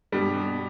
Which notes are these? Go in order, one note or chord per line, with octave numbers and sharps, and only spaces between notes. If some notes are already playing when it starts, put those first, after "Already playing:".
G2 B2 G3
B2